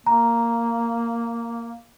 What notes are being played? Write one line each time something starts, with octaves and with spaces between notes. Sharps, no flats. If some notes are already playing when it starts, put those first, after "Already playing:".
A#3 A#5